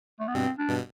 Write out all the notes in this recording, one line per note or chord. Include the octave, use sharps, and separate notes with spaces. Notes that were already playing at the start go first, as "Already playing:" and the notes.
A3
B3
G2 B2 C4
D4
G2 B2